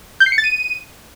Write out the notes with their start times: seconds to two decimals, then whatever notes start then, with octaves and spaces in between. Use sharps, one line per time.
0.20 G6
0.26 C7
0.32 C#7
0.38 A6
0.44 D#7